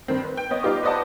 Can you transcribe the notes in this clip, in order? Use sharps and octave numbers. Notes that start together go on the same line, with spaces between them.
G2 D#3 C4
B4
G5
B3 C#5 D#5
G3 D#4 F4 G4 D6
B4 C5 D5 D#5 F#5 A5